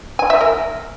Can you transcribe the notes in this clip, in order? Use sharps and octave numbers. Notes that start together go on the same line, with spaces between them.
G#5
E5
A#4